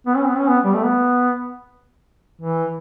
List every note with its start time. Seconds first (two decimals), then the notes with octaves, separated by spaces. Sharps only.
0.06 B3
0.16 C#4
0.27 B3
0.38 C#4
0.48 B3
0.64 G3
0.74 A3
0.84 B3
2.41 E3